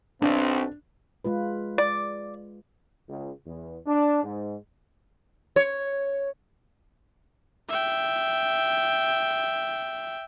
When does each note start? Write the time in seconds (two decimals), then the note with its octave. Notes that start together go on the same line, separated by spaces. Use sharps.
0.22 B1 C4 D4
1.25 G#3 F4 B4
1.78 D5
3.08 C#2
3.46 E2
3.87 D4
4.23 G#2
5.56 C#5
7.70 E5 G5